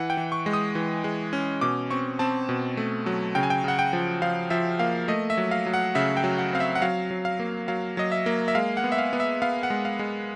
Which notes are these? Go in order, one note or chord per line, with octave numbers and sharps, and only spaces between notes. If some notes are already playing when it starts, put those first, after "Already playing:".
Already playing: E3 F#5
G5
E3
C#6
G#3
D#6
E3
G#3
C#4
B2 D6
C4 C#6
C4 A5
B2
A3
F#3
C#3 G5
G#5
G5
C#3 F#5
G5
F3
F3 F5
F3 E5
A#3 F5
A3 D#5
E5
F#3
F5
F#3
F#5
C#3 E5
G5
F#3
F#5
C4 F5
E5
F#5
F#3 F5
F#3
F5
A#3
F#3 F5
F#3 D#5
E5
A#3
E5
G#3 F5
F#5
B3
E5
F5
B3
E5
B3 F5
F#5
G#3
F5
G#3